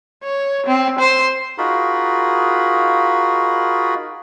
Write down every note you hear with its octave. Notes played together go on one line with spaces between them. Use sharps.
C#5
C4
C5
D#4 F4 F#4 G#4 A#4 B5